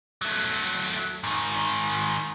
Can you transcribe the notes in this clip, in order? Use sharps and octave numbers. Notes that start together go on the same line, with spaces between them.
F#3 A3
G#2 D#3